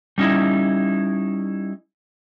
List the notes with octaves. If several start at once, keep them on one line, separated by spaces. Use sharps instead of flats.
G3 C#4 D#4 E4